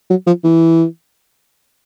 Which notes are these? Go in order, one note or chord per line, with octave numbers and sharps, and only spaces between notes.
F#3
F3
E3